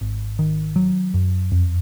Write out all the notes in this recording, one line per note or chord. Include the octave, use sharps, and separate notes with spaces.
G#1
D#3
F#3
F#2
F2